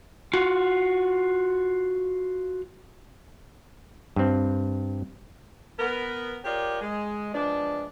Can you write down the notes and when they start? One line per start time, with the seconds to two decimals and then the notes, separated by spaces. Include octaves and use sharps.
0.33 F4 F#4
4.16 G2 C4
5.79 B3 A#4
6.45 F4 G4 G#4 A#4 C#5 D5
6.80 G#3
7.34 F3 G#3 B3 D4